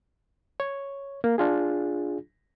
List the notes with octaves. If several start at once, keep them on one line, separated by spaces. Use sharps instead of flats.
C#5
A#3
D4 F4 G#4